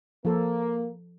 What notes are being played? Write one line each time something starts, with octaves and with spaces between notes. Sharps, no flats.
F3 A#3 A4